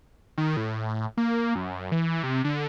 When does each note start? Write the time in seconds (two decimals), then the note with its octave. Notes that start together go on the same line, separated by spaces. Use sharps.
0.38 D#3
0.57 A2
1.17 A#3
1.55 F#2
1.92 E3
2.23 C3
2.44 D3